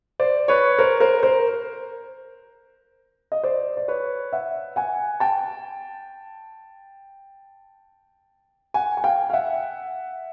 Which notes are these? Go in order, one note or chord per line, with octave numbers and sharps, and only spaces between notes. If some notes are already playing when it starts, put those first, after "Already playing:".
C5 D5
B4 C#5
A#4 C5
A#4 C5
A#4 C5
D#5
C5 D5
D5
B4 C#5
E5 F#5
F#5 G#5
G5 A5
F#5 G#5
G#5
F5 G5
F5
E5 F#5